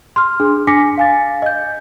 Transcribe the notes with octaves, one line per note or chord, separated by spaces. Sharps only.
C6 F6
D4 G#4
D4 G#5 D6 A#6 B6 C#7
F5 G#5 A6
D#5 G6